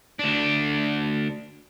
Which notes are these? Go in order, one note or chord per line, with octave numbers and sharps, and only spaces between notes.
D2 D4